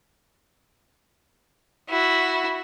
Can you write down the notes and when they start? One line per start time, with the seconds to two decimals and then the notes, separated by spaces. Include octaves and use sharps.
1.89 E4 F#4